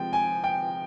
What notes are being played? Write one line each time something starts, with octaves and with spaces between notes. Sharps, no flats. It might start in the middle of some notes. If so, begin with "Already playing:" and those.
Already playing: C3 F3 G#3 G5
G#5
G5